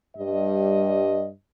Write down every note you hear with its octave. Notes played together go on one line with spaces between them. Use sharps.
G2 G3 D#5